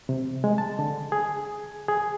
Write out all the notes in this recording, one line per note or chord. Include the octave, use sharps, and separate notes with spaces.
C3
G#3
A5
D3
G#4
G#4